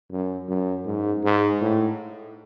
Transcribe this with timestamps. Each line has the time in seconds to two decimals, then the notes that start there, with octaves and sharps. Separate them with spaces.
0.11 F#2
0.49 F#2
0.86 G#2
1.24 G#2
1.61 A2